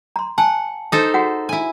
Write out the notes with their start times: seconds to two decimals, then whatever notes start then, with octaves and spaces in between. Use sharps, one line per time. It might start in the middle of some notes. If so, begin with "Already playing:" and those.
0.16 A#5 C6
0.38 F#5 G#5 A5
0.92 D#4 A4 C5
1.14 F#4 G#4 F#5
1.49 E4 G#5